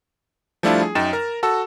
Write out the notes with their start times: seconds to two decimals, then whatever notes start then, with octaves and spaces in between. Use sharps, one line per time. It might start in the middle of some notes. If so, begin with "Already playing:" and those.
0.63 F3 G3 A3 D4 E4 F4
0.83 G#4
0.95 F#2 D#4 G5 A6 E7
1.13 A#4 A#5
1.43 F#4 A4 A5 E6